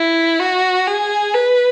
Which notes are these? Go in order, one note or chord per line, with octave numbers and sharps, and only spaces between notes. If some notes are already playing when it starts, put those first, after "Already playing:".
Already playing: E4
F#4
G#4
B4